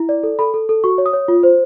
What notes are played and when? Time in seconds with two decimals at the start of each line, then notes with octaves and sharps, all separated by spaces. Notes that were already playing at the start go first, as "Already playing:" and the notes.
Already playing: E4
0.09 D5
0.23 A4
0.39 A4 B5
0.54 A4
0.69 A4
0.84 F#4 C#6
0.98 C#5
1.06 D#6
1.13 C#5
1.28 F4
1.43 C5